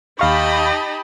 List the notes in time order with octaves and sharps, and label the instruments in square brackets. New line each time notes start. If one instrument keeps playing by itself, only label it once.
[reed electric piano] D#2 F5 C#6 [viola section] D#4 A5 B5 [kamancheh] G4 D#5